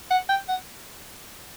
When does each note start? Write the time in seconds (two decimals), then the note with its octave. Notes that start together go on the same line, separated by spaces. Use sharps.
0.11 F#5
0.29 G5
0.49 F#5